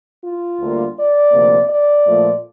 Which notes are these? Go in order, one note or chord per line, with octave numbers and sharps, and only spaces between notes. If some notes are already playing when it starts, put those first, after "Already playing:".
F4
D2 D3 G3 A#3
D5
D2 C3 F3 A#3
D5
A#2 F3 A3